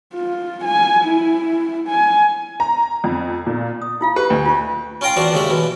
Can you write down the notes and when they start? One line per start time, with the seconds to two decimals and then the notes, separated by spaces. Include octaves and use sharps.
0.14 F4
0.64 G#5
1.04 E4
1.88 G#5
2.60 A#5
3.04 F2
3.47 A#2
3.82 D#6
4.01 E4 F4 F5
4.16 G4 B4
4.30 D2
4.46 F4 C#6
5.01 C#4 F4 C#5 G5 A#5 C6
5.16 E2 C4 D4 F4 F#4 C5
5.32 D#2 C#3 G#3 C#4 E5
5.50 B2 E3